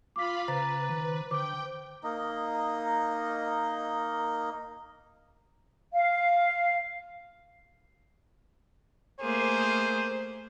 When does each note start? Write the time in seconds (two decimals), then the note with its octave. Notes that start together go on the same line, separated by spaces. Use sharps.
0.16 F4 F5 B5 D6 B6
0.48 C#3 B4 C5 A#5 A6
0.90 D#3
1.31 D3 C5 G5 D6
2.04 A#3 D#4 D#5
5.93 F5
9.20 A3 A#3 G#4 C5